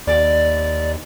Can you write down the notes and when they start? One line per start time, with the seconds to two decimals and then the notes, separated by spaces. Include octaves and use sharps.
0.07 D#2 D5